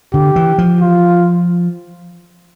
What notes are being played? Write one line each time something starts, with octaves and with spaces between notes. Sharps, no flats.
D3 G4
E3
F3
F4